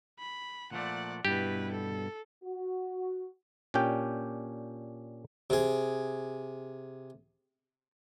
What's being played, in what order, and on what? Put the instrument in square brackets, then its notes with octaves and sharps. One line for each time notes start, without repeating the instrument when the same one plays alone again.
[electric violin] B5
[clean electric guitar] A#2 F3 A3 [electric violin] D5 F#5
[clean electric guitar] G2 B2 [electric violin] E4 B4 [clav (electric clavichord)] G4
[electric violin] A4
[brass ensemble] F#4
[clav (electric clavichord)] A#2 C#4 D4 G4 G5
[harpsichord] C3 G#4